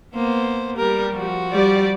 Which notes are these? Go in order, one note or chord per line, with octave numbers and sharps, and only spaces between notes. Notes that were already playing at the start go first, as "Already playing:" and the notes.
A#3 B3 C5
G3 A#4
F3 F#4
G3 D5